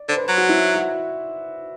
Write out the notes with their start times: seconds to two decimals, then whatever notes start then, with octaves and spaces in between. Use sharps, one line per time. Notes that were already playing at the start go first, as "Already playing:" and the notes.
Already playing: D5
0.09 D3 C5
0.17 B4
0.24 C5
0.29 F#3
0.37 F#4
0.49 E4
0.75 F#4